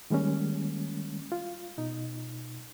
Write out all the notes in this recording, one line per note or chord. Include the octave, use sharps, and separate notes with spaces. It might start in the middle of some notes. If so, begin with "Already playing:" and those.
D#3 G3 G#3 A#3 C#4
F4
B2 D#4